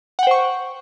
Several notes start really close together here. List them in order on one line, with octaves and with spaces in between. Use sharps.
F#5 G5 C5 C#6